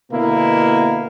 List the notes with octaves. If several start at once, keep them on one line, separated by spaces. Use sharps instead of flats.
B2 D3 A#3 B3 E4